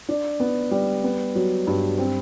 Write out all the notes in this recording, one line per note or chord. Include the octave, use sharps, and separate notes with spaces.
D4
B3
G3
B3
F#3
G2
C4